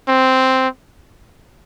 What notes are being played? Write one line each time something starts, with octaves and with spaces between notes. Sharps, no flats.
C4